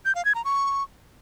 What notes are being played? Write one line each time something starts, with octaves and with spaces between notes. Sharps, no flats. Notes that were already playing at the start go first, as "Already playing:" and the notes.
G6
F5
G#6
A#5
C#6